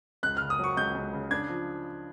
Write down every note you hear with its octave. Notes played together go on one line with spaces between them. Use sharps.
C#2 F#6
C#3 F6
D#6
F#3 C#6
C#2 G6
C#2
C#3
D4 G#6
F3